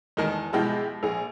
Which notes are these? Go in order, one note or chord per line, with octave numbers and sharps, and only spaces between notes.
E2 D#3 G#3 A5
B2 F3 G#3 E4 G4
A#1 G#4